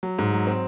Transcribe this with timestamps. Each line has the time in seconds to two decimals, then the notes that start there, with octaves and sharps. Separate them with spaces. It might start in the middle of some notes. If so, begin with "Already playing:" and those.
0.03 F#3
0.19 G#2
0.33 F#3
0.47 C4